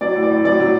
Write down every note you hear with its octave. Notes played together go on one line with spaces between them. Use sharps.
F#3 D5
A2
D5
A2
F#3 D5
F#3